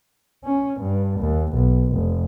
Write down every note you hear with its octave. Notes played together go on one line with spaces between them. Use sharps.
C#4
G2
D#2
B1
F1